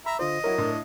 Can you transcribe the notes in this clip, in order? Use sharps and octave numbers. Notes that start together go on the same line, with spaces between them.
E5 A#5 B5
D3 F4 C5 D#5
F#3 E4 A#4 C#5
A2 D4